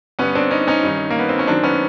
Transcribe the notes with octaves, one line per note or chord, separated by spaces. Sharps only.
G2 D3 B3 C#4
C4 D4
C#4 D#4
C#4 D#4
G2 D#3
A#3
B3
C4
C#4
F#2 D#3 C4 D4
B3 C#4